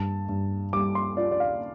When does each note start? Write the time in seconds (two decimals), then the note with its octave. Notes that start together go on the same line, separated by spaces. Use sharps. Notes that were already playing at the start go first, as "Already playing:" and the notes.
Already playing: G2 A5
0.29 G2
0.73 G3 D6
0.95 C6
1.17 F4 D5
1.31 D5
1.40 F5